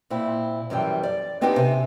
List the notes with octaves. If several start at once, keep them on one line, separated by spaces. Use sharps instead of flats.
A#2 C4 E4
F#2 E3 F3 G3 G5
D5
B3 C4 D4 D#4 G4 B4
C3 G#5